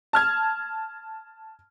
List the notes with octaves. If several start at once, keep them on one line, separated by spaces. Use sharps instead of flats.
A5 F6 G#6